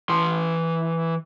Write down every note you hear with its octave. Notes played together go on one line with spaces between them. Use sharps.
E3 C6